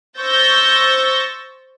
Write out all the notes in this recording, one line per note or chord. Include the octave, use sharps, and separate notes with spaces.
C5 C#6 E6 G6 A6 A#6